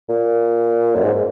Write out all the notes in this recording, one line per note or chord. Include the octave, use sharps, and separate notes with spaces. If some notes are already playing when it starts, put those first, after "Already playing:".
A#2
F#2
G#2